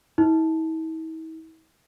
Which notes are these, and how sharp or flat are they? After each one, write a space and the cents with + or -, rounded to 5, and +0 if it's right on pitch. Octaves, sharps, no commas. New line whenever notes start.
E4 -45